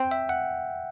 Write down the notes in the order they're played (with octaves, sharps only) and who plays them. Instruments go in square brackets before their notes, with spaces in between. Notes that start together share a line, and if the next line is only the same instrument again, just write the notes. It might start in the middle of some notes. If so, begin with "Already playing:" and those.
Already playing: [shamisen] C4 [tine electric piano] G5
[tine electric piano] E5
F#5